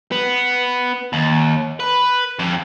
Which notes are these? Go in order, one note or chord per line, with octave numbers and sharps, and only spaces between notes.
B3
D#2
B4
F2